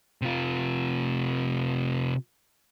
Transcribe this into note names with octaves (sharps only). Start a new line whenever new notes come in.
C3 F4